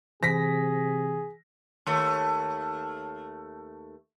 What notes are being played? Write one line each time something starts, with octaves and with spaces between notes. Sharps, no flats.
C3 E3 G#4 A#6 B6
D#2 A3